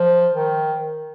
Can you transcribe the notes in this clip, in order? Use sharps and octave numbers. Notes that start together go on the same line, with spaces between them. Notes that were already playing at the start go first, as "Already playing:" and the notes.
Already playing: F3
D#3